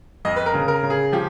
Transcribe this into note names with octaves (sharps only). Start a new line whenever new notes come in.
F2 D#5
B4
A#4
C#3
A#4
C#3
G#4
F3 G4